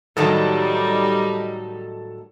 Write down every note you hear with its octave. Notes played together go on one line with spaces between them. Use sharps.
A2 D#3 F#3 G3 D#4 A4 A5